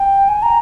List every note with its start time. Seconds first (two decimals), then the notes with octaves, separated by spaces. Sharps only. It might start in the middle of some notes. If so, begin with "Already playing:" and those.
Already playing: G5
0.28 G#5
0.43 A#5